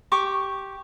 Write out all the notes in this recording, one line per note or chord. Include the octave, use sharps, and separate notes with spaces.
G4 C#6 D6